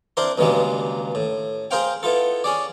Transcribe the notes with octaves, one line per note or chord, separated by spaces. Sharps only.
C4 D4 E4 A#4 C5 C6
C#2 G2 B2 D#3 G#3 A#3
A2
G#4 A#4 C5 F5 G5
B3 E4 F4 A4
C#4 G#4 D5